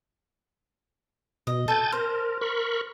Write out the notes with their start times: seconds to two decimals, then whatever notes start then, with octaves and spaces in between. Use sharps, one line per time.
1.47 B2 D#5
1.68 A4 G#5 G6 A6
1.92 A#4 C5
2.41 A#4 B5 C#6